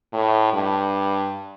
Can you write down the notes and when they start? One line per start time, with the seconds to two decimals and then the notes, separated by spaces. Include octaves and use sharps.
0.13 A2
0.53 G2